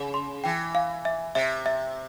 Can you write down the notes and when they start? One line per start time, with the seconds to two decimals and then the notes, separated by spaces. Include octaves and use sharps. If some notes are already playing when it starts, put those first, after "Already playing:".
Already playing: C#3
0.14 C6
0.44 E3 G5
0.75 F5
1.05 E5
1.35 C3 E5
1.66 E5